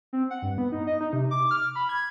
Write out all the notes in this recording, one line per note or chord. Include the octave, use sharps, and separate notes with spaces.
C4
F#5
G2
B3
D#4
D#5
D#4
C3
D6
F6
B5
G#6